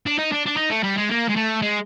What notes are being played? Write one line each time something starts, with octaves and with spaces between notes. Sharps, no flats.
D4
D#4
D4
D4
D#4
A3
G3
G#3
A#3
G#3
A3
G#3